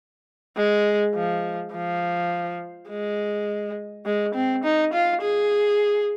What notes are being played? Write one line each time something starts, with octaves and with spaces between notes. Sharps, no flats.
G#3
F3
F3
G#3
G#3
C4
D#4
F4
G#4